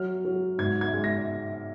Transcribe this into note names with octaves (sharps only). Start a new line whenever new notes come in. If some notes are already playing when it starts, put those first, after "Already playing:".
Already playing: F#3 F6
F#3
G#2 G#6
G#6
G#3
A#6